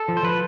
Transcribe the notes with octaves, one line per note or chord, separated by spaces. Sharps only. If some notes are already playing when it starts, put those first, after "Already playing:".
Already playing: A4
F3
C5
F3 B4